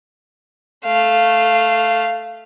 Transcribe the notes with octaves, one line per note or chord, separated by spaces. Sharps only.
A3 F5